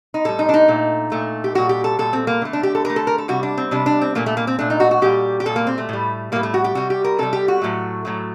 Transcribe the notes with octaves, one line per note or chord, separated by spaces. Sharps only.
D#4
A2 G3 A4
D#4
D4
D#4
A#2 A3
A#2 A3
G4
A#2 G3 F#4
G4
A4
A#2 G3 A4
C4
A#3
D3 A3
D4
G4
A4
D3 A3 A#4
A4
A#4
A4
C3 G3 F#4
D4
C4
C3 G3 D4
D4
C4
A#2 A3 A#3
A3
A#3
C4
A#2 A3 D4
D#4
F#4
F#4
A#2 G3 G4
G4
A#2 G3 A4
A#3
C4
A3
A2 G3
A2 G3 A#3
A3
F#4
G4
C3 G3 F#4
G4
A#4
C3 G3 A4
G4
F#4
A2 F#3 A3
A2 F#3 A3